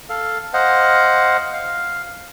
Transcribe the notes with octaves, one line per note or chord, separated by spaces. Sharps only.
A4 F5
C5 D#5 F5 F#5
F5